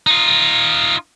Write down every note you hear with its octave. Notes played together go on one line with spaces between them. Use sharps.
D#4 F4